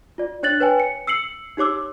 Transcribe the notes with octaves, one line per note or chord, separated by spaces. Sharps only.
F4 D5
D4 C#5 F#6 A6 F#7
B4 C#5 G5 G#5
C#7
E6 C7 C#7 F#7
D#4 G4 C#5 D6 E6